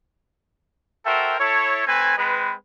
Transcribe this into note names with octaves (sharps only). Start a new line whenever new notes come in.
F#4 A4 A#4 C5 E5 G5
E4 A4 C#5
A3 C4 B4 G#5
G#3 C4 B4